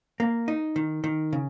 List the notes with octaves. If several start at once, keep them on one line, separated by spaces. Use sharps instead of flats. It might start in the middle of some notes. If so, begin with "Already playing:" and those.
A#3
D#4
D#3
D#3
C#3